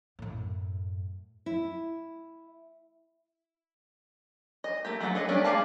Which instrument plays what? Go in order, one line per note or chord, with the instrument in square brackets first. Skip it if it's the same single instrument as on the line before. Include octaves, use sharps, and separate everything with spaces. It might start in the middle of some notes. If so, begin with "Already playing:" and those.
[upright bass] F#2 A2
[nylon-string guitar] E4
[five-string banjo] D#5
A3 A#3 G4
F#3 A3 A#3 A4 F#5
G#4 A4 B4 D#5
G3 A3 B3 C#4 D4
G#3 D5 F5 A5